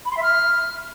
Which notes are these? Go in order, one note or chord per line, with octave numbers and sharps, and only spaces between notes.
B5
C6
E5
F6